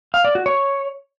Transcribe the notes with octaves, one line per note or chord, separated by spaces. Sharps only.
F5
D5
F#4
C#5